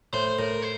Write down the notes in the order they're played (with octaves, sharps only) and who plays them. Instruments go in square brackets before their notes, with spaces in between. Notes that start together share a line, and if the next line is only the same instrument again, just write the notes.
[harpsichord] A2 [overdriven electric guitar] C5
[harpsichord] A2 [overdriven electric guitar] A#4
[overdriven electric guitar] C5